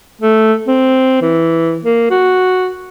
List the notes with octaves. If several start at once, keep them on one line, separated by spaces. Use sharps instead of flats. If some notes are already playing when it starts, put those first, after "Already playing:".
A3
C4
E3
A#3
F#4